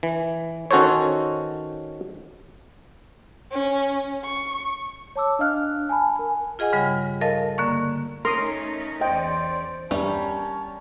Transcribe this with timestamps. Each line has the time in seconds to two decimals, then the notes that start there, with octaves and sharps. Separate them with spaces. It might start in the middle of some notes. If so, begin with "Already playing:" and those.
0.03 E3
0.71 D#3 C#4 F#4 A4 C5 C#5
3.52 C#4
4.24 C#6
5.16 C#5 A5 D6 E6
5.39 D4 D#5 F5 F6 F#6
5.89 G#5 A5 B5
6.16 A#4 G#5
6.59 F4 G#4 D#5 F#5 G#5
6.73 G2 C#3 G3
7.21 A4 A#4 D#5 F5 A5
7.58 D3 A#3 D5 C#6
8.25 A3 C#4 D#4 A#4 C6 D#6
9.01 E2 C#4 C5 D5 D#5 G5
9.91 E2 G2 G3 C#4 A#4 C#5 A5